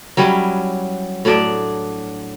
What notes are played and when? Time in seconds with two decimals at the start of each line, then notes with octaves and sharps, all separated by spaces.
0.17 F#3 G3 C#4 E4
1.25 A2 F#3 D4 D5